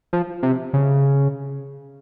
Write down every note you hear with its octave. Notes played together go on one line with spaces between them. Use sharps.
F3
C3
C#3